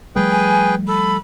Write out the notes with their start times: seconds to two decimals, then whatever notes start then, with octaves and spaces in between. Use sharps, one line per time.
0.16 F3 G3 A3 G#4 B4 G5
0.30 G#5
0.88 A4 B5